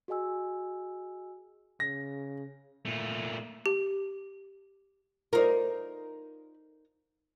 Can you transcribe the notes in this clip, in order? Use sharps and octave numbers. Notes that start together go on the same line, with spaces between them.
F#4 G#4 D#5 G#5 E6
C#3 A#6
A#2 A3
G4
D#4 F4 A#4 C5 D5